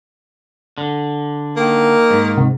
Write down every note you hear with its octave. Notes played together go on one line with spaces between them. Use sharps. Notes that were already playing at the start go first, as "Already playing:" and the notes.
D3
D#3 A#3
G#2
C3